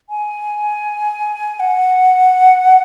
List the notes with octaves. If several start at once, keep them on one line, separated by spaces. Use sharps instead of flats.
G#5
F#5